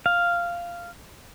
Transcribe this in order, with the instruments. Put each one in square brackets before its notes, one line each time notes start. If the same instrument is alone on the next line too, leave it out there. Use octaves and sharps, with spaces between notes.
[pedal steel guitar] F5